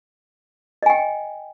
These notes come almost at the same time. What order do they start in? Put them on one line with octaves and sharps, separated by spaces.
D#5 G#5 G5